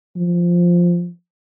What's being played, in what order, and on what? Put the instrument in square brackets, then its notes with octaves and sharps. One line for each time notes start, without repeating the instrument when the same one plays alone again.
[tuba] F3